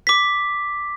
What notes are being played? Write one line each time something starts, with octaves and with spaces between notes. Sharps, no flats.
D6 B6